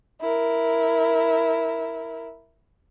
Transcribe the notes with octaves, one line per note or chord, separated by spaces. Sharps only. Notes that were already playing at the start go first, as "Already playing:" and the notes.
E4 A#4